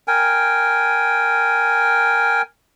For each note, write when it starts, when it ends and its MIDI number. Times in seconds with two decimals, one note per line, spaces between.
0.08 2.42 70
0.08 2.42 79
0.08 2.42 80